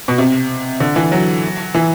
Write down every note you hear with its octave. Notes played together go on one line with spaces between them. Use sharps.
B2
C3
D3
E3
F#3
E3